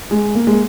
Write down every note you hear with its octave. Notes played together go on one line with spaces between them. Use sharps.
G#3
A#3
G#3